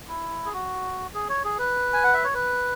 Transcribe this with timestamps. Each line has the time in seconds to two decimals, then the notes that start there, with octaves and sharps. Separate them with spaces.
0.09 E4
0.46 G#4
0.53 F#4
1.14 G#4
1.29 C#5
1.44 G#4
1.59 B4
1.93 G#5
2.04 F#5
2.14 E5
2.24 C#5
2.34 B4